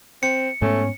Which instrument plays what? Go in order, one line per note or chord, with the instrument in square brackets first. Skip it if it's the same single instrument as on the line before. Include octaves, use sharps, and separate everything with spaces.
[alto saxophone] C4 [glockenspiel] C#7
[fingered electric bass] G#2 B3 [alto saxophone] A3 [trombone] C#4